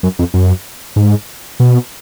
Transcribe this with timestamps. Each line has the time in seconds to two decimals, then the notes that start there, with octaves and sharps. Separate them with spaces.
0.03 F#2
0.19 F2
0.34 F#2
0.96 G#2
1.60 B2